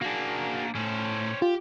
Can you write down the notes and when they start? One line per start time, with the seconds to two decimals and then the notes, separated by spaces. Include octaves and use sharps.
0.01 A#3 D4 F#4 G#4
0.75 A2 C#4 C5
1.42 F4 G4